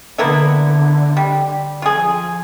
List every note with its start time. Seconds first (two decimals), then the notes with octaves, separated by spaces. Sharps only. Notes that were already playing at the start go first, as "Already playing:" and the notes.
0.18 D3 A#3 B3 E4
1.17 G3
1.82 F3 F4 G#4